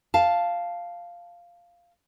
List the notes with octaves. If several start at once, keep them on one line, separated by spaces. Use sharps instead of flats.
F5 A5